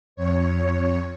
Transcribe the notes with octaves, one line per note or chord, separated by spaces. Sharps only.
F2 C#5